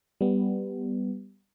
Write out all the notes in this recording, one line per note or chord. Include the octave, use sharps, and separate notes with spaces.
G3 B3